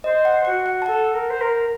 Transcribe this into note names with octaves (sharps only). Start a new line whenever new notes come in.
C5 D#5
F#5
F#4 F#5
F#5
A5
A4 F#5
A#4
C5
A#4